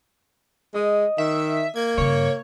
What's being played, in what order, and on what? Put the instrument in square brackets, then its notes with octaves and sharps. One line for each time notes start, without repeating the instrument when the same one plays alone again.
[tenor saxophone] G#3 [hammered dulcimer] D#5
[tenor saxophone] D#3 [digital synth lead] E5
[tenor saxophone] A#3 [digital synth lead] G#6
[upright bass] G2 C#3 [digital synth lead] C#5